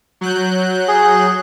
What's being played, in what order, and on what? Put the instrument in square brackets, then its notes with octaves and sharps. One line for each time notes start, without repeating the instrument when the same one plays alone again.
[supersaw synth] F#3 F#6 G6
[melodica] G#4